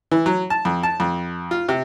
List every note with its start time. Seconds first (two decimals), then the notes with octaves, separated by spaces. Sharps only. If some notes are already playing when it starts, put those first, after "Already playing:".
0.11 E3
0.26 F#3
0.50 A5
0.65 F2
0.83 A5
1.00 F2
1.51 F4
1.69 C3